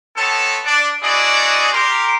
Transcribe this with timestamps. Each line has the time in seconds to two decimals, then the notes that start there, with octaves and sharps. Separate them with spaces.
0.17 B3 C4 A4 C#5 A5
0.65 D4 D5
1.02 D4 E4 F#4 G#4 D5 D#5
1.72 G4 A#4 C6